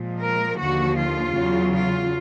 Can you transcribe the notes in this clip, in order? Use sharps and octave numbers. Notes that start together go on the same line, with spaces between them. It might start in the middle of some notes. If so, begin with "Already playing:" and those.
Already playing: A#2 F3 G#3
A#4
D#2 D3 F3 A#3 F#4
F4
E2 C#3 F#3
F4